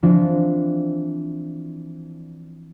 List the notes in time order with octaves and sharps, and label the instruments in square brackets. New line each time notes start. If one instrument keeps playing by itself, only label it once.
[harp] E3 F3 C4 D4